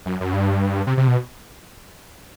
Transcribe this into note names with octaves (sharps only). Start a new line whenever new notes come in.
F#2
F#2
G2
C3
C3
B2